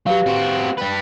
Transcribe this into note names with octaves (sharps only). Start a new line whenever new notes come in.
F#3 G4 B4 F5
C4 F#4
G3 B4